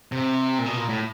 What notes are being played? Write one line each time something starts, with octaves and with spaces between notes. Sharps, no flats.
C3
A#2
B2
A#2
A2